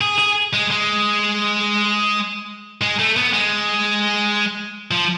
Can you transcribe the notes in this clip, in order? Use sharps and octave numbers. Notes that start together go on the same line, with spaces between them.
G#4
G#4
G#3
G#3
G#3
A3
B3
G#3
F3